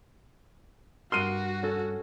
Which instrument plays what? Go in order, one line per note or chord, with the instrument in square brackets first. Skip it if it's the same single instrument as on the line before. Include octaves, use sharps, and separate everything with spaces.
[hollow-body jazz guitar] G2 A#4 C6 [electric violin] F#4 [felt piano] F6 C7 D#7
[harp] C#4 A4